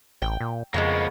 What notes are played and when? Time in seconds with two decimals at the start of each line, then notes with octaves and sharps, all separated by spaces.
0.22 A1 G5
0.41 A#2
0.74 F2 C#3 E3 G#3 A#3 B3